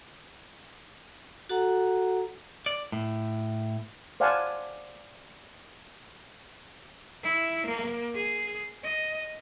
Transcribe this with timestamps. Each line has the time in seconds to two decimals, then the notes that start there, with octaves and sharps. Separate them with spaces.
1.49 F#4 A4 F#5 A#5
2.66 D5
2.92 A2
4.20 C5 D5 F5 F#5 G#5 A5
7.23 E4
7.66 A#3
8.14 G#4
8.83 D#5